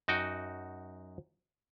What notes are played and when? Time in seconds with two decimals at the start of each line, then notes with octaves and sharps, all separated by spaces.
0.08 F#2 D#4 F#4 G5